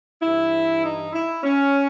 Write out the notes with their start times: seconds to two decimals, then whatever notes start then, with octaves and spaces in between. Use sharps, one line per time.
0.22 G2 E3 E4
0.83 D#4
1.13 E4
1.43 C#4